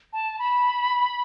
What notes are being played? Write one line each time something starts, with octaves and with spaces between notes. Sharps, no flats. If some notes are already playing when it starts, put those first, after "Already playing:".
A5
B5